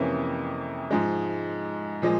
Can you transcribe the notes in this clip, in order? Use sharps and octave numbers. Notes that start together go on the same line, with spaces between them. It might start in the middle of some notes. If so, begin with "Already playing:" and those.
Already playing: F2 C3 E3 A#3 C#4
G#2 F3 G#3
A#2 F3 G#3